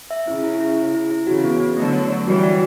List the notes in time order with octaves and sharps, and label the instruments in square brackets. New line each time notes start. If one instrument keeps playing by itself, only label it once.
[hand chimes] E5
[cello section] C#3 [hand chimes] E4
[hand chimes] E4
E4
E4
E4
E4
[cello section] C#3 E3 [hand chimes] F#4
[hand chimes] B3
B3
[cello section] D3 F#3 [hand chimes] A3
[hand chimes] C#5
C#5
[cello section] E3 G3 [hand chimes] F#4
[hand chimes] F#4